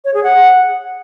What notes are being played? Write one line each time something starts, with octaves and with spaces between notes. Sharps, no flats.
C#5
G#4
F#5